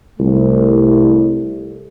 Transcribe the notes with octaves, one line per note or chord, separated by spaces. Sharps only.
C2 A3